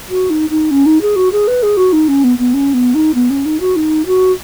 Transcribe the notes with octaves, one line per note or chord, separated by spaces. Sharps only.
F#4
D#4
D#4
C#4
D#4
G#4
F#4
G#4
B4
G#4
F#4
D#4
C#4
B3
B3
C#4
B3
D#4
B3
C#4
D#4
F#4
D#4
F#4